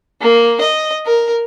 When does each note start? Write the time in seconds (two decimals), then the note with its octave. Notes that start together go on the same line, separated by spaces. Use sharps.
0.21 A#3
0.61 D#5
1.06 A#4